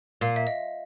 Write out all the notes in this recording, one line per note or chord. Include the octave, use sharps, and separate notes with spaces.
A#2 F5
E5
D#5